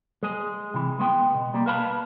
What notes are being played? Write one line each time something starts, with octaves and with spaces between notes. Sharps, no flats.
G#3 G#4
C3 E3
C#2 G#3 B3 G5
B2
G3 A#3
A#4 B4 F5 A5 B5